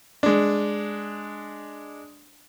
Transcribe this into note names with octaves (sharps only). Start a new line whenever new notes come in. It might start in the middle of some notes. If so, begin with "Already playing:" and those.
G#3 D4